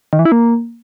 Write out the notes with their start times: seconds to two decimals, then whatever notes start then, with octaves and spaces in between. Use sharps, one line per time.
0.13 D#3
0.19 E3
0.25 E4
0.32 A#3